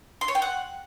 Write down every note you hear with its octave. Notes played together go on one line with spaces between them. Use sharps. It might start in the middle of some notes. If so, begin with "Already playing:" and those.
C6
C#5
G5
F#5